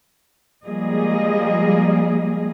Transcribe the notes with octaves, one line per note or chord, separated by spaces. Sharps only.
F3 G3 G#3 A#3 G#4 D#5